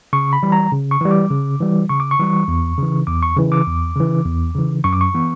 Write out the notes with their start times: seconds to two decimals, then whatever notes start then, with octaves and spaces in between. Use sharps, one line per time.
0.13 C#3 C#6
0.33 B5
0.43 E3 G3
0.52 A#5
0.72 C#3
0.91 C#6
1.01 E3 G3
1.11 D6
1.31 C#3
1.60 E3 G3
1.89 C#3 C#6
2.00 D6
2.11 C#6
2.19 E3 G3
2.48 E2
2.78 C#3 E3
3.07 E2 D6
3.23 C#6
3.37 C#3 E3
3.52 D6
3.67 E2
3.96 C#3 E3
4.25 E2
4.55 C#3 E3
4.84 F#2 C#6
4.93 D6
5.01 C#6
5.15 E3 B3